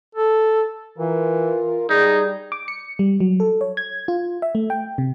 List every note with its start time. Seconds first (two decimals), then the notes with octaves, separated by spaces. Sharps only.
0.15 A4
0.98 E3 F4 A#4
1.90 G3 D#4 G#4 D5
2.52 D6
2.68 C#7
2.99 G3
3.20 F#3
3.40 A4
3.61 C#5
3.77 G#6
4.08 F4
4.42 E5
4.55 A3
4.70 G5
4.98 C3